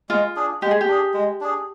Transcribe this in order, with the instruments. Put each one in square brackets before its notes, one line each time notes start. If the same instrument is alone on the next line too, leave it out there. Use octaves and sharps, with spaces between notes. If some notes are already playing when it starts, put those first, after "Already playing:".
[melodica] G#3 [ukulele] F4
[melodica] D4 G#4
[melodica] G#3 [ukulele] G4
[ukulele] G#4
G4
[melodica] D4 G#4
G#3
D4 G#4